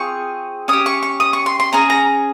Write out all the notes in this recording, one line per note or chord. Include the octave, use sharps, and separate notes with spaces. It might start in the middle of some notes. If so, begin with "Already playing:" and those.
Already playing: C4 F4 G#4 C#6
C#4 G4 D#6
C#6
C#6
D#6
C#6
C6
C6
C#4 G#4 A#5
A#5